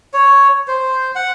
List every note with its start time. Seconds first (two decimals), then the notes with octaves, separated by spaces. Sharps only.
0.14 C#5
0.68 C5
1.15 F#5